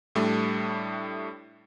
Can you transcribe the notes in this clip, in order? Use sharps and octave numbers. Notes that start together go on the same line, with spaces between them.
A2 G3 A3 D4